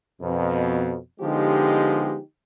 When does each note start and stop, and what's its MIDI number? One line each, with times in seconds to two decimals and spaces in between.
0.22 0.95 41
0.22 0.95 47
1.21 2.19 50
1.21 2.19 53
1.21 2.19 56
1.21 2.19 59
1.21 2.19 63
1.21 2.19 67